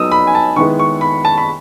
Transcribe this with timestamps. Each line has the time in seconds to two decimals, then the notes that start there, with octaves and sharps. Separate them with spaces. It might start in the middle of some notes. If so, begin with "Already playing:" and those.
Already playing: F#3 B3 D#4 D#6 E6
0.12 B5
0.27 G#5
0.35 A5
0.56 D#3 G#3 B3 E4 C#6
0.79 C#6
1.01 B5
1.25 A5
1.38 B5